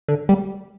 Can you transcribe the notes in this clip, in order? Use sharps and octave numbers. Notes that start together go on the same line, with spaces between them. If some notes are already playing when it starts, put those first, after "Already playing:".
D3
G3